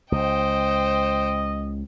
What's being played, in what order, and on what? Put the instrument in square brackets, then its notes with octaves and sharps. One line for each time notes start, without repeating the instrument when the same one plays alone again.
[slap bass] C#2 [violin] C5 G5 [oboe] D#5